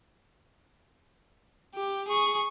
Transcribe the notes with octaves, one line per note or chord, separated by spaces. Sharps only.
G4
G#4 C#6